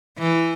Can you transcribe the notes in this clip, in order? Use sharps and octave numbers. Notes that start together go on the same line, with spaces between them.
E3